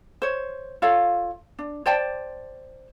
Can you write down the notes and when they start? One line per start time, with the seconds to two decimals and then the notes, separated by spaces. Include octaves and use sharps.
0.22 C5 C#5
0.82 F4 A4 C#5 F5
1.59 D4
1.86 C5 D5 G5 A5